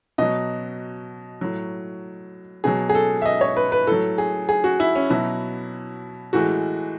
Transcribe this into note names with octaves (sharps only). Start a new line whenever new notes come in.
B2 F#3 D#5
A2 F#3
B2 F#3 G#4
G#4
A4
E5
D#5
C#5
B4
B4
A2 F#3 A4
G#4
G#4
F#4
E4
C#4
B2 F#3 E4
A2 E3 G#3 F#4